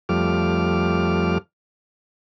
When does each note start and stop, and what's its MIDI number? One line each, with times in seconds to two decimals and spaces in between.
0.09 1.38 41
0.09 1.38 53
0.09 1.38 55
0.09 1.38 57
0.09 1.38 86
0.09 1.38 89